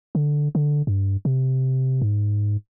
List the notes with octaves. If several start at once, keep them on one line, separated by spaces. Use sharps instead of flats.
D3
D3
G2
C3
G#2